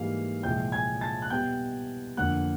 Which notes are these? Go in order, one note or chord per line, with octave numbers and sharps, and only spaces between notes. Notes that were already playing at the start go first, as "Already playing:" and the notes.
Already playing: G#2 E3 G3 A#3 F5
C2 A#2 F3 G#3 C4 G5 G6
G#5 G#6
A5 A6
F#6
B2 G3 B3 G5 G6
F2 D3 F#3 A#3 F#5 F#6